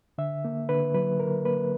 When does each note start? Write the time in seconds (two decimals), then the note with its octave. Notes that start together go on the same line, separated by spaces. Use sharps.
0.18 D3 E5
0.45 A#3
0.69 D3 B4
0.94 F#3 B4
1.20 D3 A#4
1.45 A#3 B4